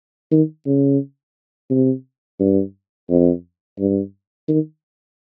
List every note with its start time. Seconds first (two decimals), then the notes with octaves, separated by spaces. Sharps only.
0.32 D#3
0.66 C#3
1.70 C3
2.40 G2
3.10 F2
3.79 G2
4.48 D#3